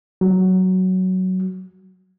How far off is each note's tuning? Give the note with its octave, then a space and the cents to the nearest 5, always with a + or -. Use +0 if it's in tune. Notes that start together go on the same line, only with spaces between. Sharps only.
F#3 +10